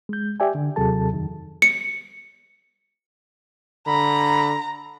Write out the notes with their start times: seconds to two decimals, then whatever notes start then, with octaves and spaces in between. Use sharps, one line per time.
0.09 G#3 G6
0.40 G4 D5 E5 G5 G#5
0.55 D3
0.76 D#2 C3 F#3 G#4 A4 A5
1.12 F2 D#3
1.62 C#7
3.87 D3 A#5 B5